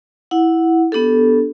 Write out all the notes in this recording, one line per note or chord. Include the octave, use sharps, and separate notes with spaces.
E4 F#5
B3 D4 G4 A4